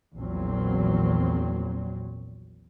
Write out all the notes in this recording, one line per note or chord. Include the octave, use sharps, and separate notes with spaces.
A#1 E2 A#2 F#3 C4